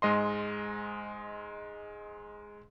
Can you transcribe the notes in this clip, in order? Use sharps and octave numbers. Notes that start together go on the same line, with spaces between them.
G#2 G#3 D#5 C6